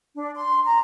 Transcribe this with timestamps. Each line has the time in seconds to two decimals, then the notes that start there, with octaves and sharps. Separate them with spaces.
0.15 D4
0.35 C6
0.65 A#5